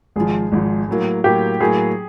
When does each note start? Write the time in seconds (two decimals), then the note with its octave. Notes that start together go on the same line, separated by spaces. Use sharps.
0.16 G#1 G#2 F3 G#4
0.52 G#1 G#2 F3
0.88 A2 F#3 A#3
1.24 A2 F#3 A#3 G4
1.60 A2 F#3 A#3 G#4